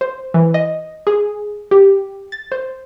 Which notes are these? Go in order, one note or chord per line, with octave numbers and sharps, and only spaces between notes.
C5
E3
D#5
G#4
G4
A6
C5